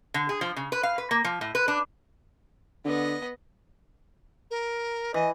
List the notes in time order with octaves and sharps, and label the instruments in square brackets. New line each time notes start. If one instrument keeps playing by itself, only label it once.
[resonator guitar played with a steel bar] D3
G#4
F3
C#3
B4
F5
B4
A#3
F3
A2
B4
D4
[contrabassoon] D3 [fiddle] B3 D#5
[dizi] A#4
[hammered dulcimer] E3 [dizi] D#5